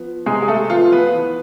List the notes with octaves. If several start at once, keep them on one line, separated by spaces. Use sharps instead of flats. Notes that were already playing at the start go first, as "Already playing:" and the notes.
Already playing: F3 B3
C3 G#3 G#4
G#4
A3 A4
F3 B3 F4
B3 B4
E3